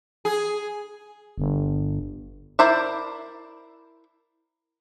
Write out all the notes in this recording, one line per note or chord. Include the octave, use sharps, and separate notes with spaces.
G#4
G1
E4 A#4 C5 D5 E5